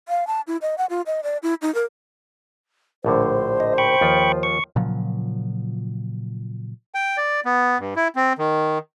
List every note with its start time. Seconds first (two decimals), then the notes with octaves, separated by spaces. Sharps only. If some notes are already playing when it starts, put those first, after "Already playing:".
0.08 F5
0.27 A5
0.47 E4
0.62 D#5
0.78 F#5
0.90 F4
1.06 D#5
1.23 D5
1.43 E4
1.62 D#4
1.74 A#4
3.05 A#1 A2 D3 C5
3.60 D#5
3.78 G5 B5 C#6
4.01 D#2 F3 F4
4.43 C#6
4.76 A#2 C#3 F3 F#3
6.94 G5
7.17 D5
7.45 B3
7.79 G2
7.96 E4
8.16 C4
8.38 D#3